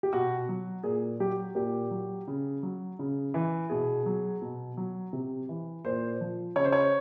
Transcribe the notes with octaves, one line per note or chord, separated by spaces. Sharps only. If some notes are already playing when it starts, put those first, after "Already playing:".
G4
B2 F#4
F#3
A#2 G#4
F#3 G4
A#2 G4
F#3
C#3
F#3
C#3
E3
B2 G#4
F#3
B2
F#3
C3
E3
A#2 C5
F3
C#3 C#5
C5
C#5